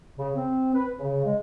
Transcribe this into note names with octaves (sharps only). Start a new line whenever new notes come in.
C#3
C4
B4
C#3
G#3